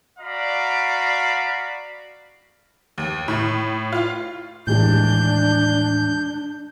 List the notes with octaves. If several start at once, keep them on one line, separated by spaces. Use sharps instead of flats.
F#4 D5 F5 A#5 B5
D#2
A2
F4
D#2 A2 E3 G#3 D4 G6